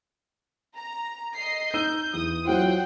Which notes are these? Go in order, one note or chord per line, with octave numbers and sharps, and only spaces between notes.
A#5
D#5 C7
D#4 E6 G6 D#7
E2 D#6
F#3 E4 F4 C5 F#5 G5